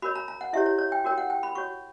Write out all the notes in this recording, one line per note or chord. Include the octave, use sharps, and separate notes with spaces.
F#4 A#4 C#5 B5
A#5
A#5
F#5
E4 G4 C#5 E5
C#5
C#5
G5
F#4 A#4 C#5 G5
F#5
G5
B5
F#4 C#5 C#6